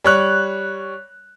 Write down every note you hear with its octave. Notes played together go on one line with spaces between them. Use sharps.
G3 C#5 F#6